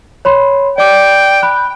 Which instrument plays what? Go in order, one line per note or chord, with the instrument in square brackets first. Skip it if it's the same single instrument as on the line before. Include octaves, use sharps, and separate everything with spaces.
[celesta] C#5 B5 C6
[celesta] D5 D6 [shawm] G5
[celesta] B5 F#6